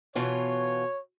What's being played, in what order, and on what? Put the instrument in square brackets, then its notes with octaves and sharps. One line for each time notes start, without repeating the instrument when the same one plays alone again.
[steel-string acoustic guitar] B2 E3 F4 [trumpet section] C#5